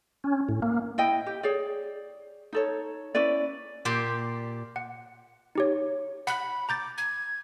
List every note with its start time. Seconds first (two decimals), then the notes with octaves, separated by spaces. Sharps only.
0.24 C#4
0.49 A2
0.62 A#3
0.98 E4 D#5 G5
1.27 G4
1.43 G#4 C#5 D5
2.53 D#4 A4 C#5
3.15 C#4 E4 B4 D5
3.85 A#2 G4 D5 C6
4.76 F#5
5.55 D#4 G4 C#5
6.27 F#5 B5 F#6
6.69 A#5 D6 G6 A6
6.98 G#6